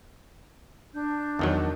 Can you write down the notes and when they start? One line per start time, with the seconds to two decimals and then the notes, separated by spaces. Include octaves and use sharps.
0.94 D4 G6
1.39 E2 D#3 F#3